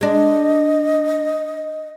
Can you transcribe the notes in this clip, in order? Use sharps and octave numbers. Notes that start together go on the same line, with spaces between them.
G#3 D4 D#5